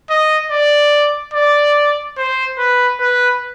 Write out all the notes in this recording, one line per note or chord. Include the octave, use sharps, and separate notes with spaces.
D#5
D5
D5
C5
B4
B4